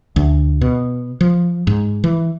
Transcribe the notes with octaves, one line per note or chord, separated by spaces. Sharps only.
D2
B2
F3
G#2
E3